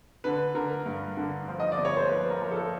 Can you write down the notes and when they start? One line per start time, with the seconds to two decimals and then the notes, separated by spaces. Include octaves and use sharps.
0.24 D3 B4
0.55 D3 A#4
0.86 G2
1.17 D3
1.48 F3
1.60 D#5
1.72 D5
1.78 G1
1.85 C#5
1.97 C5
2.09 F3 B4
2.30 A#4
2.40 F3
2.51 A4